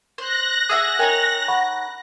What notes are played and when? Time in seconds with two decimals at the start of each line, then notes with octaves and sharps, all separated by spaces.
0.18 C5 F#6 A#6
0.69 G#4 E5 F#5 D#6
0.99 D#4 A#4 C#5 G5 G#5
1.48 F#5 B5 C#6